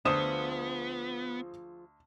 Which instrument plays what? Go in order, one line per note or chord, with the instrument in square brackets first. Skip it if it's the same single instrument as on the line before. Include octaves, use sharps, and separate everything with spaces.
[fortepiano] D2 [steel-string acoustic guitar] F3 F4 G#4 [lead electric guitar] B3 [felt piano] C5 D#6 E7